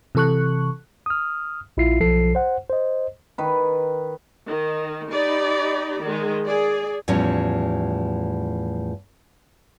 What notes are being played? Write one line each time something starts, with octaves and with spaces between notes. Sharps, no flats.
C3 E3 A4 C#6 F#6
D#6 F6
A#1 E4 F4 E5 C7
B1 F3 A4 C7
C5 F#5
C5 D#5
D#3 B4
D#3
D#4 G4 D5 B5
D#3 G#3
G#4 D5
E2 A2 F3 G3 C#4